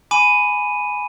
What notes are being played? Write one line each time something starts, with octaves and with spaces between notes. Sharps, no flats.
G#5 B5 D6 D#7